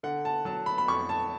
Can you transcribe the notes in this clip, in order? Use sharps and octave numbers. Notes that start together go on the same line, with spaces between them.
D3 F#5
A5
F#3 A5
B5
B5
F2 C#6
A5